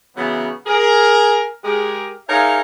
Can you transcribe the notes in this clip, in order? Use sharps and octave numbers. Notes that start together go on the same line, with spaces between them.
C#3 E3 F#3 B3
G#4 A#4
G#3 G4 G#4 A#4
D#4 G#4 A#4 C#5 E5 F5